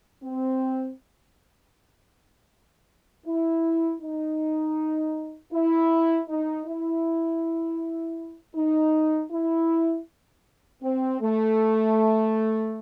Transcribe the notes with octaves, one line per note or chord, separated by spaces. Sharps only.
C4
E4
D#4
E4
D#4
E4
D#4
E4
C4
A3